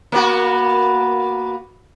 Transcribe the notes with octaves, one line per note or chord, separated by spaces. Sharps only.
A#3 B3 F#4